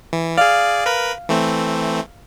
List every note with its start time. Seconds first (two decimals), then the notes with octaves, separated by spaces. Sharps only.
0.13 E3
0.38 G#4 D5 F5
0.86 A#4 B4 B5
1.29 E3 A3 C4